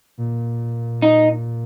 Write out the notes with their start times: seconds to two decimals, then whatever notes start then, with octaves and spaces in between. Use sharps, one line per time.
0.18 A#2
1.02 D#4